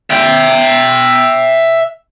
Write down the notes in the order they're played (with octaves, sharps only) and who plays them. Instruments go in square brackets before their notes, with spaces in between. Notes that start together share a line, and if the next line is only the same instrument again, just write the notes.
[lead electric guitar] E5 G5